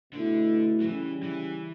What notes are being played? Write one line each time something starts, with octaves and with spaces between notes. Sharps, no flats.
B2 D3 A3 E4
F#3
C#3 E3 G3 C#4
E3